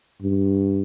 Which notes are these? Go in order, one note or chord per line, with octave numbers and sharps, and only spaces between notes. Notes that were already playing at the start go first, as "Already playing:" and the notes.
G2